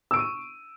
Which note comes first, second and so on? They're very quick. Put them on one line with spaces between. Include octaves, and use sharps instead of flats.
E6 D7 C#6 D#7